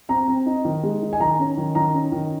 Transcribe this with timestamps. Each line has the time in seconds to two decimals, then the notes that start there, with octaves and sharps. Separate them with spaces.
0.09 C4 A#5
0.28 C4
0.46 D#4
0.65 D#3
0.83 G#3
1.02 D#4
1.13 G#5
1.20 D#3 A#5
1.39 C#4
1.57 D#3
1.75 D#3 A#5
1.94 C#4
2.12 D#3